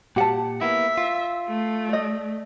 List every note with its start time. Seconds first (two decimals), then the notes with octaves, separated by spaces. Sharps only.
0.16 A#2 G4 F#5 A5
0.61 A#3 B3 E4 E5
0.97 F4
1.48 A3
1.89 D5 D#5